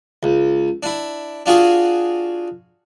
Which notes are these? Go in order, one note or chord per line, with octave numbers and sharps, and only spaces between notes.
C#2
D4 E4
D4 F4 F#4 G#4